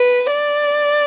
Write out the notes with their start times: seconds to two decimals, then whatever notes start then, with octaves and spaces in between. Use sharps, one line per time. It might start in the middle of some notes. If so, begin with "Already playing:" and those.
Already playing: B4
0.31 D5